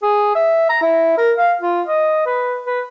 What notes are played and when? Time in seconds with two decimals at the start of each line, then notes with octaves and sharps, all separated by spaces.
0.02 G#4
0.35 E5
0.69 A#5
0.82 E4
1.17 A#4
1.37 F5
1.61 F4
1.87 D#5
2.26 B4
2.65 B4